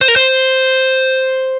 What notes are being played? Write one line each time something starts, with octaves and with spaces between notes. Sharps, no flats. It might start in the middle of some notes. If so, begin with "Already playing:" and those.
C5
A#4
C5